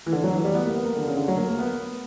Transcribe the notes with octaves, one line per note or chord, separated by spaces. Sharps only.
E3
D3
F#3
E3
G3
B3
A#3
B3
A#3
D3
C#3
D3
F#3
A#3
A#3
B3